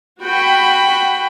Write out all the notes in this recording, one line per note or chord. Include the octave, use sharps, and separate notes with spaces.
F#4 G5 B5